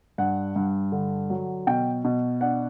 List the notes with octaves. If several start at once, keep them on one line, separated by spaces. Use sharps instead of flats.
G2 F#5
G2
D3
F#3
B2 G5
B2
D4 F#5